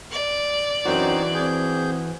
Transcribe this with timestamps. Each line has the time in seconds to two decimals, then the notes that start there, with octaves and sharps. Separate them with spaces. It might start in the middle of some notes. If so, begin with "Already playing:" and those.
0.12 D5
0.85 F#2 E3 C4 D#4 F#4 C5
1.35 C4 G#4 G6